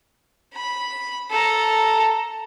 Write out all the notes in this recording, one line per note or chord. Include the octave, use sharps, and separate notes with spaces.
B5
A4 A#5